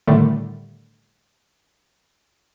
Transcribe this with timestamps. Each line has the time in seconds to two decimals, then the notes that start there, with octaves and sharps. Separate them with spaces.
0.07 A2 D3 D#3 G3 A3